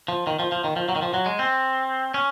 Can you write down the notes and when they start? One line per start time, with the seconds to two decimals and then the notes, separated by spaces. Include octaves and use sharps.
0.08 F3
0.27 D#3
0.39 F3
0.52 F3
0.64 D#3
0.76 F3
0.89 F#3
0.96 D#3
1.02 F3
1.14 F#3
1.26 G#3
1.39 C4
2.14 C#4